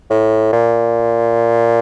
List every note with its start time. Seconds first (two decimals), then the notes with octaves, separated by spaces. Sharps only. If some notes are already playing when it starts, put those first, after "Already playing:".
0.10 A2
0.53 A#2